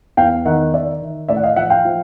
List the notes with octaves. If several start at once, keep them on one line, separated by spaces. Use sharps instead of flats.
E2 F5 G5
D#3 E5 F#5
D#3 D5 E5
D#3
A2 D5 E5
F#5
D#5 F5
F3 E5 F#5
F5 G5
F3